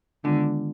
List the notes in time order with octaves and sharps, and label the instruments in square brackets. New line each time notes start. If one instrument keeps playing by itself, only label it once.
[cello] D3 [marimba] D#3 G#3 B3 D4 F4